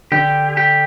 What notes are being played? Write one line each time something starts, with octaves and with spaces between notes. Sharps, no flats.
D3 G4
G4